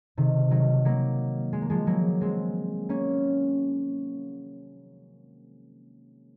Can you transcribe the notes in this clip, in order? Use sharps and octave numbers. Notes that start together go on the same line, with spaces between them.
C3 D#3
D#3 F#3
F#3 A#3
G#3
A#3
F3 G#3
F#3 A#3
G#3 C4
A#3 C#4